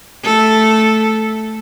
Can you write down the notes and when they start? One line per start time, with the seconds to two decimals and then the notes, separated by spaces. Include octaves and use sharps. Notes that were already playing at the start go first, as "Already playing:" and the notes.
0.24 A3 A4